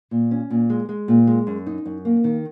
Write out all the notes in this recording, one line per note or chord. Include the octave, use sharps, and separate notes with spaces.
A#2
C#4
A#2
G#3
G#3
A#2
G#3
F#2
D#4
F#2
A#3
D#3